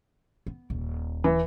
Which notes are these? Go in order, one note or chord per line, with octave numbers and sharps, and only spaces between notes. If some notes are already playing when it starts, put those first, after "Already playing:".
B3
D#1
E3